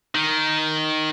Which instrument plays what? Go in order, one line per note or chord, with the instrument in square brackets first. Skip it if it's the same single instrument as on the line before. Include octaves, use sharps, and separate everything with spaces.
[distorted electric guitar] D#3